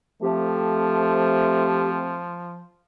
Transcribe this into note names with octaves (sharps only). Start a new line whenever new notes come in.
F3 A3 C4 G4